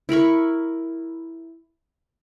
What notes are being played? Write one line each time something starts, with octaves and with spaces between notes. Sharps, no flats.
E4 A#4 B5 C#6